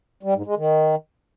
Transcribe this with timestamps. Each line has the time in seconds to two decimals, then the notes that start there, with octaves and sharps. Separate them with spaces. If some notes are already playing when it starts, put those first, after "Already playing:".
0.23 G3
0.34 G#2
0.46 G#3
0.57 D#3